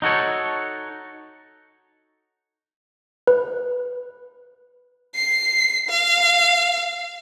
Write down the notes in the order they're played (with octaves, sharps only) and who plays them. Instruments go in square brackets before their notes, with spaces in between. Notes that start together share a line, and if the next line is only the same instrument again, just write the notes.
[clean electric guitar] D#4 F#4 A4 C#5
[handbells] B4
[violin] C7
F5